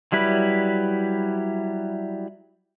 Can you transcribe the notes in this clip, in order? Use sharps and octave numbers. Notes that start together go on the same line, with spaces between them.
F#3 G3 E4 B4